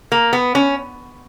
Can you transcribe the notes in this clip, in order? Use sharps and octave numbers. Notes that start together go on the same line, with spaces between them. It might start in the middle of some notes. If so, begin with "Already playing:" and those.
A#3
B3
C#4